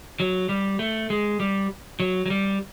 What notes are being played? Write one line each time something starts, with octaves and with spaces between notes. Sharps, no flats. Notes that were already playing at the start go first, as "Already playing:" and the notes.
F#3
G3
A3
G#3
G3
F#3
F#3
G3